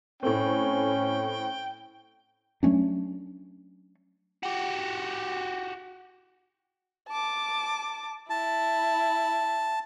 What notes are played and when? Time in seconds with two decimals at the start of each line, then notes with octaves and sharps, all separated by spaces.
0.23 A2 A3 C4 C#4 G5
2.63 F#3 A3 C#4 D4
4.43 F#4 G4
7.08 A5 D6
8.30 E4 A5